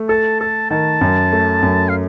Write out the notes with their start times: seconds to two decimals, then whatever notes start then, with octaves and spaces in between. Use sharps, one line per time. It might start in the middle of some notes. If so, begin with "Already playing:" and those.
Already playing: A3
0.09 A4 A5
0.40 A4 A5
0.70 D#3 A5
1.01 F#2
1.33 A3
1.62 F#2
1.89 F5